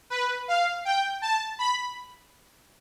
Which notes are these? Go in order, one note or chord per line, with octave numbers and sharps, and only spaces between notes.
B4
F5
G5
A5
B5